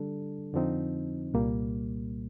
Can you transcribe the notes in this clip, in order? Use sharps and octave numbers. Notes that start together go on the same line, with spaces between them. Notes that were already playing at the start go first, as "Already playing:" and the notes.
Already playing: D3 G3 D4 A4
F2 D3 F3 C4 D#4
C2 A#2 G3 A#3